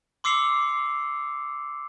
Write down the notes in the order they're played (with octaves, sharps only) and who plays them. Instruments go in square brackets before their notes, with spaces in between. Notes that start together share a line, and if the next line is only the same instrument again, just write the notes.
[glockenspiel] C6 D6 E6 C7 C#7 F7